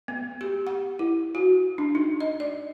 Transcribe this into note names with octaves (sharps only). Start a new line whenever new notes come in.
B3
G4
F#5
E4
F#4
D4
D#4
D#5
D5